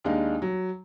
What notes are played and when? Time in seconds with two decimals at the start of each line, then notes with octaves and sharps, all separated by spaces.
0.04 D#2 G#3 D4 D#4 F5
0.42 F#3